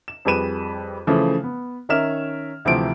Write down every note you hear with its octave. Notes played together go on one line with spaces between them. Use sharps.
E7
F2 G3 G#4 B4 D#7 E7
C#3 E3 F3 A3
B3
D#3 C#4 A#4 E5 F6 E7
D2 C3 E3 F3 C4 D7